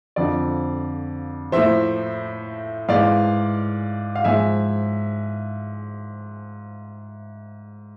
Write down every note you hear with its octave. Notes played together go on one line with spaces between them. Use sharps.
F2 D3 F3 D5
A2 F3 C5 E5
G#2 E3 D5 F5
F5
G#2 F3 E5 G#5